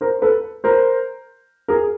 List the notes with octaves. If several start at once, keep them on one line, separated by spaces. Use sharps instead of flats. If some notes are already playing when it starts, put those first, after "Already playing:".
A#4 C5
A4 B4
A#4 C5
G#4 A#4